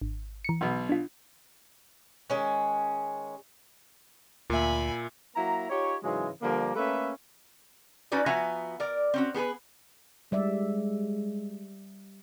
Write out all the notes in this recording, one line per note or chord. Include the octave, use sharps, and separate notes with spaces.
G#1
E3 C#7
B1 B2
D4 F4
D#3 G#3 C#4
D2 A#2 E5 G#5 B5
F#3 A#3 E4 A#5
D#4 F4 G4 C#5
G#2 C#3 E3 F#3 G#3
D3 F3 G3 A#3
A3 A#3 C#4 A4 B4 E5
C#4 D#4 F#4 B4 D5
F3 B3 F#4 E5 G#5 A#5
A#4 D5
C4 C#4 F#4
B3 G#4 A4 B4
G3 G#3 D5 E5